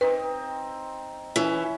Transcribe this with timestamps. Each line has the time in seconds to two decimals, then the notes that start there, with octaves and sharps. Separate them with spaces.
0.01 C4 D#4 B4
1.36 E3 C#4 E5